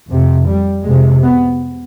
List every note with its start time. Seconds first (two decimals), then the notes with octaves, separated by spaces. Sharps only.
0.09 F2 C3
0.47 G3
0.84 F2 C3 G#3
1.22 B3